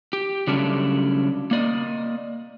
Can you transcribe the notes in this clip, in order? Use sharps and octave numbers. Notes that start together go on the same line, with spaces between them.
G4
C#3 F#3 G3 A3 C#4 D4
A#3 D5 D#5